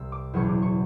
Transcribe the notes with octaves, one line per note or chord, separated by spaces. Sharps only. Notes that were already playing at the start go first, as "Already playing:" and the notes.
Already playing: C2 C3 E6
D6
F#1 E2 B2 F#3 C#6
D6
C#6